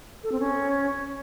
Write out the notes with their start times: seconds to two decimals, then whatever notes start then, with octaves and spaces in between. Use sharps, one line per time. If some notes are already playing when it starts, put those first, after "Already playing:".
0.24 A4
0.32 C4
0.40 C#4